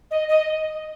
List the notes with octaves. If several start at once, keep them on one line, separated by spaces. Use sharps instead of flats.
D#5
D#5